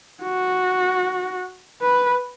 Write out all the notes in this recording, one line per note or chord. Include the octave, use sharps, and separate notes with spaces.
F#4
B4